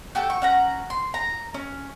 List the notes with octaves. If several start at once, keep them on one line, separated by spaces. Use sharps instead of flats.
F#4 G4 A4 G5
C#6
C#4 F#5 A#5
C6
A#5
C#4